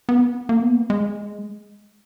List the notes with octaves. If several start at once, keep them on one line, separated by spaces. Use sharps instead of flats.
B3
A#3
B3
A#3
G#3